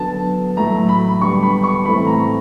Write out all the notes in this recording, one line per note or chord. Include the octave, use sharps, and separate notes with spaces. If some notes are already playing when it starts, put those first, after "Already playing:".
Already playing: D3 F#3 B3 A5
A2 F#3 A3 A#5
B5
D3 G3 B3 C#6
B5
C#6
A2 E3 A3 C4 B5
A#5